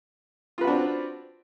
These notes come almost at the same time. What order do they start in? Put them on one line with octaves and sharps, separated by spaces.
F4 B4 F#4 D4 C4